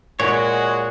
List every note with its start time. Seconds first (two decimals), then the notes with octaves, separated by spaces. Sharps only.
0.20 A#2 G#3 F#4 C#5